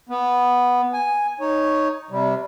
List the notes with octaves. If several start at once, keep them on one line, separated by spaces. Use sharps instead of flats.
B3
G#5
D#4 C#5
C3 G3